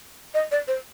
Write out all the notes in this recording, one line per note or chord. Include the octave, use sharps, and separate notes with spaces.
D#5
D5
C5